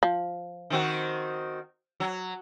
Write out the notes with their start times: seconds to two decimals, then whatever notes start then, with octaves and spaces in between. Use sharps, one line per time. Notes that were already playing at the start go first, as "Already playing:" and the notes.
0.03 F3
0.70 D#3 C4 F#4
2.00 F#3